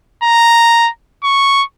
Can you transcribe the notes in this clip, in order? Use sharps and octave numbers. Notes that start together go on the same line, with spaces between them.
A#5
C#6